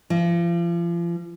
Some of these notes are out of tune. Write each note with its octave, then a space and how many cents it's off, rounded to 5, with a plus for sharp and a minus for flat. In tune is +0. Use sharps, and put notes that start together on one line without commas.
F3 -35